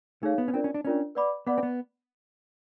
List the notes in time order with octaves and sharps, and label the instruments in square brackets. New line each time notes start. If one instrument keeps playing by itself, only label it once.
[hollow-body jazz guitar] A3 [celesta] D#4 G#4 C#5 F5
[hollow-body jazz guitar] B3
C#4
[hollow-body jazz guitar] C4 [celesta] D4 F4 A#4 D5
[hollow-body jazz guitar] C#4
D4
[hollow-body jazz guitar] C#4 [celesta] D4 F4 A#4 D5
[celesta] B4 D5 F#5 B5 D6
[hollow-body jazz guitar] B3 [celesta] B4 D5 F#5 B5 D6
[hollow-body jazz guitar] C4
B3